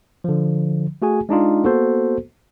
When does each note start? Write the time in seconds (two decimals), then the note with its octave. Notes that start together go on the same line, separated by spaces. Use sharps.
0.24 D3 F3
1.02 A3 F#4 G#4 G#5
1.29 G#3 D4 D#4 F4
1.63 A#3 B3 F#4 A4 C5